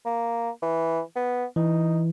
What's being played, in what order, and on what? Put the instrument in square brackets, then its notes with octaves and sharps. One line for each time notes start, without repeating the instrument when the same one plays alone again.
[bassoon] A#3
E3
B3
[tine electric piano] E3 [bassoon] D#4